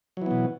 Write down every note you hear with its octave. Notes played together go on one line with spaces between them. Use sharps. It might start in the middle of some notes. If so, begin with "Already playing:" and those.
B2 E3 F#3 B3